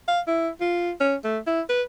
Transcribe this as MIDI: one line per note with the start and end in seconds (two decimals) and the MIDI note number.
0.08 0.20 77
0.27 0.49 64
0.60 0.91 65
1.00 1.16 61
1.24 1.39 57
1.47 1.61 64
1.69 1.82 71